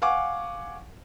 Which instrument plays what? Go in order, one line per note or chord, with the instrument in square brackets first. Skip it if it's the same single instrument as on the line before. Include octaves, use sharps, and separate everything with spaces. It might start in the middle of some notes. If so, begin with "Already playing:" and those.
[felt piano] F5 F#5 G#5 C#6 D6